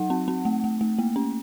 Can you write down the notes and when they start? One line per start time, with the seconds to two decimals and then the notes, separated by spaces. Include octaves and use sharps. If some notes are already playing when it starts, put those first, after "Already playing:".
Already playing: F#3 D#4 F#5
0.10 C4
0.28 C4
0.45 A3
0.64 A3
0.81 A3
0.99 A#3
1.16 C#4